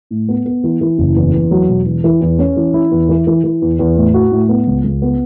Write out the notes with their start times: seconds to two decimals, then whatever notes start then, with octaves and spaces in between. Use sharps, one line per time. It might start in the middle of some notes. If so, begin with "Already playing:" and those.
0.11 A2
0.29 B3
0.46 B3
0.64 E3
0.81 E3
0.98 F#1
1.16 E2
1.34 E2
1.51 F#3
1.69 E1
1.86 E2
2.04 E3
2.21 E2
2.39 C#4
2.57 E3
2.74 E4
2.91 E2
3.09 E3
3.27 E3
3.44 E3
3.62 E2
3.79 E2
3.97 A2
4.14 F#4
4.32 A2
4.49 B3
4.67 C#2
4.84 C#2
5.02 B3